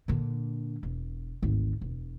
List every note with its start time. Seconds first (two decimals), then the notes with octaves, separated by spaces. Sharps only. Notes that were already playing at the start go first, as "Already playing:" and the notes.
0.08 A#2 D3
0.83 E1
1.43 G#1 D2
1.81 E1